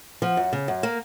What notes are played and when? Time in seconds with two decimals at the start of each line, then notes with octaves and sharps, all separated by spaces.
0.22 F3 F#5
0.37 F#2
0.53 C#3
0.68 F#2
0.83 A#3